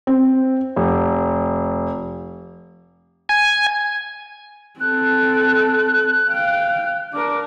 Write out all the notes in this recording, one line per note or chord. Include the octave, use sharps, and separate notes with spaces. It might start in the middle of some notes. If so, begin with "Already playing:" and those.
C4
F1
G#5
C4 A4 F#6
F5 G5
D4 A#4 D6